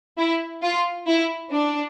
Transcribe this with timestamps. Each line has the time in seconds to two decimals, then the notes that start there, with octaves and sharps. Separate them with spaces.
0.18 E4
0.63 F4
1.07 E4
1.51 D4